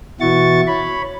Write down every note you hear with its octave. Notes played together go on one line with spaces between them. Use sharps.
B2 E3 E4 F#4 C#6 A6
C#5 B5